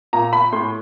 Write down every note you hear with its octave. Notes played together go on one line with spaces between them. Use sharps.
A#2 A#5
B5
A2 C6